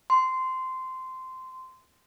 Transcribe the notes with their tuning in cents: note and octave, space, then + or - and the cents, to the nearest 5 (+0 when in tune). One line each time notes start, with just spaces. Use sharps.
C6 -15